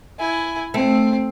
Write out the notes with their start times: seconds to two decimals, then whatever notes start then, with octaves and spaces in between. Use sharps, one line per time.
0.19 E4 G#5
0.74 A3 C4